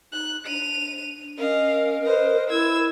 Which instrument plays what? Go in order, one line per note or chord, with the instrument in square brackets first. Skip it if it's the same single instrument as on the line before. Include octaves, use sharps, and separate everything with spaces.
[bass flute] D#4 [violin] F#6
[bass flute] D4 [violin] D#7 F7
[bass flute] C#4 [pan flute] A#4 [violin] D#5 F5
[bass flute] B4 [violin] C5 D#5
[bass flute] E4 [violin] E6 G#6